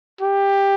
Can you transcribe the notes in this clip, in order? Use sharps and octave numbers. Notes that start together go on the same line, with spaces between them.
G4